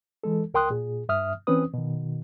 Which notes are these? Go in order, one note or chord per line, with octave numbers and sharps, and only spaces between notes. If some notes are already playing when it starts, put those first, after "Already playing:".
E3 G#3 A4
C#2 A#4 G5 C6 D#6 F#6
A#2 G#4
G2 E5 D#6 F6
E3 C4 C#4 B4 D#6
B2 D#3